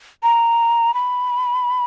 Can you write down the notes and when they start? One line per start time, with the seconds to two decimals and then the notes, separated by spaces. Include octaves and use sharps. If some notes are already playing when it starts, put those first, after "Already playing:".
0.23 A#5
0.94 B5